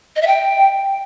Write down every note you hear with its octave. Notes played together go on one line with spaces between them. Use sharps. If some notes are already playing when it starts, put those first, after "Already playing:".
D#5
E5
G5